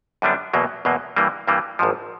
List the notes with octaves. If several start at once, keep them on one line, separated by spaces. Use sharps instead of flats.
F#2 D3 G3 B3 D4
E2 B2 F#3 A#3
E2 B2 F#3 A#3
G2 E3 G3 A#3
G2 E3 G3 A#3
G#1 G#2 F3